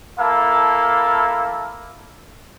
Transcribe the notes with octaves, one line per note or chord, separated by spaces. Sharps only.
A#3 E4 A4 F5 A5